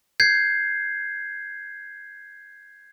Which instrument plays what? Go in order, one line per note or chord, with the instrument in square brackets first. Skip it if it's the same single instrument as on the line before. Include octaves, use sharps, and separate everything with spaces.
[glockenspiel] G6 G#6 C7